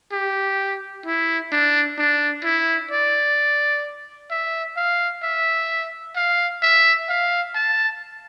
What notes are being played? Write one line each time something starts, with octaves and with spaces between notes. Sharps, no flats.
G4
E4
D4
D4
E4
D5
E5
F5
E5
F5
E5
F5
A5